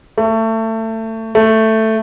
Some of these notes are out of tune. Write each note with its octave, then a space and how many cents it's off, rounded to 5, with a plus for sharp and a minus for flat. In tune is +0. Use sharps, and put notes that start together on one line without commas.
A3 +25
A3 +5